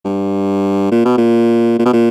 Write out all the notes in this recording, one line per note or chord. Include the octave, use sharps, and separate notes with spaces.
G2
A#2
B2
A#2
A#2
B2
A#2